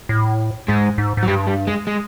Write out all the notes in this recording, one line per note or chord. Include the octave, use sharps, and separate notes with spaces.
A2
G#2 G#3
G#2
G#2
F#3
G2 G3
G3
G#3
G#3